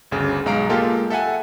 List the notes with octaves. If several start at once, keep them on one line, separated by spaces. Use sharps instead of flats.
G1 D2 C#3
B1 G#3 F5 A#5 D7
G#3 A#3 F4 G4 A4
A4 E5 F#5 G#5